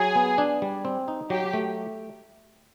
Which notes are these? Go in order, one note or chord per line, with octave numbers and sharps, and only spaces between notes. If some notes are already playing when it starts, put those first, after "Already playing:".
Already playing: F#3 G#4
B3
D4
G3
C4
D#4
F#3 G4
A3